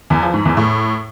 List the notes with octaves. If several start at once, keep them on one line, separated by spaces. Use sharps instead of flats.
E2
F3
G#2
E2
A2